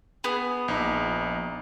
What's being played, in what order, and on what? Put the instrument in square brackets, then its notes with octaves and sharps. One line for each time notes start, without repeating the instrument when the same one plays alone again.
[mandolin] B3 G#4
[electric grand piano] A#1 D#4